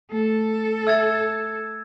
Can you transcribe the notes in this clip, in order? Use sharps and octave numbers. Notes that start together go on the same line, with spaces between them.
A3 A4
E5 E6 G#6 A6